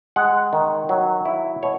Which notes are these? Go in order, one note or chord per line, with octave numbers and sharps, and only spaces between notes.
G#3 F#5
D#3
F#3
E4
B2 C#5